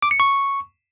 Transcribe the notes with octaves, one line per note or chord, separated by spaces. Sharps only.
D6
C#7
C#6